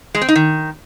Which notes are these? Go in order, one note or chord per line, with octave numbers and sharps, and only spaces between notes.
G#3
C4
D#4
D#3